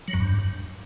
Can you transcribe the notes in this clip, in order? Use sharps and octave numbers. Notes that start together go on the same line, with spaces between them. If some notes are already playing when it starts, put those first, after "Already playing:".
F#3
F#2
G2